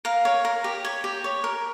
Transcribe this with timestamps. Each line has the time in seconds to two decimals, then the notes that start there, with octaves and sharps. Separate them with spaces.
0.05 A#4 F5
0.25 C#5
0.45 A#4
0.64 G4
0.85 C#5
1.04 G4
1.24 C#5
1.44 A#4